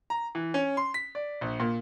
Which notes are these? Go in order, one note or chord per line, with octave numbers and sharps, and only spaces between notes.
A#5
E3
C#4
C6
B6
D5
A#1
A#2